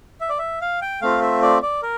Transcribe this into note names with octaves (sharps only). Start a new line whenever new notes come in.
E5
D5
E5
F5
G5
A3 C4 F4 F5
E5
D5
D5
A#4